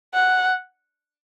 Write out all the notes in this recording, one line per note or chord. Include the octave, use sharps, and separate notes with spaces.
F#5